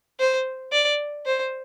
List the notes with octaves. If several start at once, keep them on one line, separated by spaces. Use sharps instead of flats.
C5
D5
C5